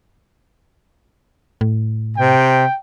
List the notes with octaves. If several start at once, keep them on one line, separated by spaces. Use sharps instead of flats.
A2
C3 G5